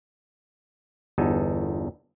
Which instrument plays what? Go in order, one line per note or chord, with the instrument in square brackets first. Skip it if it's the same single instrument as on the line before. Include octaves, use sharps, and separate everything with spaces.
[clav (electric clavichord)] G1 E2 D#4 A4 G#5